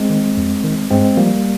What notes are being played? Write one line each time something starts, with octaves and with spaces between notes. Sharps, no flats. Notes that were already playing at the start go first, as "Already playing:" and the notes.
Already playing: G#3 C4
D#3
F2
D#3
G2 G#3 C4
F3 G3 A#3